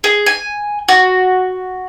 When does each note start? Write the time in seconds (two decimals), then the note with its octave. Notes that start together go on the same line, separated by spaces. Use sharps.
0.04 G#4
0.26 G#5
0.88 F#4